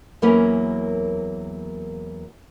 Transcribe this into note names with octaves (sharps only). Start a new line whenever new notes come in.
E2 F#3 A#3 C#4 A#4 B4